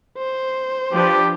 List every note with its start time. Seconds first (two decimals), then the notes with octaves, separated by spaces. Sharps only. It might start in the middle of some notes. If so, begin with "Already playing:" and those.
0.18 C5
0.92 F3 D4 G4 B4